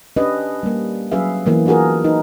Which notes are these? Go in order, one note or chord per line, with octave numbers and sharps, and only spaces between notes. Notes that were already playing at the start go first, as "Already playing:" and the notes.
C#4 D4 G4 B4 D#5
G3 A#3
F#3 C#4 G#4 B4 E5 F5
E3 A#3 B3
D4 F4 F#4 G#4 A#4
D#4 B4